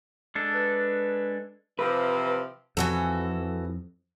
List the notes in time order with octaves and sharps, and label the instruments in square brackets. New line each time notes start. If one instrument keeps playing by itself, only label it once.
[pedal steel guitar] G#3 D4 A4
[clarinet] B4
[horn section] C3 E3 F3 [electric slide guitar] B4
[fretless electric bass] F2 [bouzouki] E3 F#4 A4